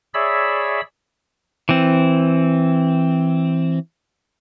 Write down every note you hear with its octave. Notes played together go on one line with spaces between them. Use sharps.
G#4 C#5 D5 E5 B5 E6
E3 C4